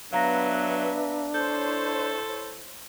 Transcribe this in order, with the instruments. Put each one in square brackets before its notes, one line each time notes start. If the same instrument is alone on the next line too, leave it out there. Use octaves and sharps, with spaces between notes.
[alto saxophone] F#3 [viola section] B3 B4 E5 [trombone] D4 [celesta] F5 A#5 A#6
[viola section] E4 C5 C#5 [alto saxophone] A4 [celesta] G6